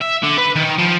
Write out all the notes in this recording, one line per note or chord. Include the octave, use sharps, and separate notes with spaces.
E5
D3
B4
D#3
F3